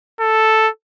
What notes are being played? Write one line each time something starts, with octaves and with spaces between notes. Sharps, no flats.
A4